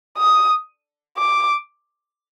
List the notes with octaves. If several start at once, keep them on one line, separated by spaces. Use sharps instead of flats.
D#6
D6